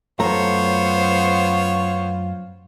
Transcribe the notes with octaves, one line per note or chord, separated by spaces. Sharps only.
F#2 A3 B3 F4 C5 C#5 A#5